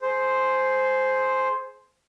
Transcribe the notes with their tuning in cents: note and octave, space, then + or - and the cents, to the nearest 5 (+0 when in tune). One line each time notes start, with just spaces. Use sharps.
G#4 +25 C5 +0